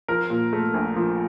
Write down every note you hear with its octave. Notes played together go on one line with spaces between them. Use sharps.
F3 A#4
A#2
A3
A#1
F3